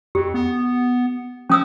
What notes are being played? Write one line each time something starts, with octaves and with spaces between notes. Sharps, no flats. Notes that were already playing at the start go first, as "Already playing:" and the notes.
F2 G4
B3
F3 C#4 D#6 E6